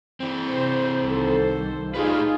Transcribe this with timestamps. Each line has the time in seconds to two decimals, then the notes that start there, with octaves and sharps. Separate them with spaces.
0.20 E3 C4
0.51 C3 C5
1.04 C2 D#3 A4 C5
1.95 A2 D#4 F4 G4 G#4 B4